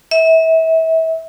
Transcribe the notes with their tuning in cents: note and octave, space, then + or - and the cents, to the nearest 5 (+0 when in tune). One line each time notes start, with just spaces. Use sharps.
E5 -30